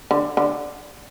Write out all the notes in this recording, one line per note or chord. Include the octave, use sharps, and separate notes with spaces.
D3
D3